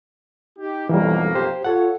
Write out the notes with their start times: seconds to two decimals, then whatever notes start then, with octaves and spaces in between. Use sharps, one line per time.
0.58 D#4 G4
0.89 B1 F2 E3 G3 A#3
1.35 G4 C5
1.64 F4 A4 C#5 F#5